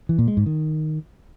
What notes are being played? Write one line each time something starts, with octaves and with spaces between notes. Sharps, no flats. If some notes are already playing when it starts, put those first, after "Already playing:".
E3
A#2
G#3
G#2
D#3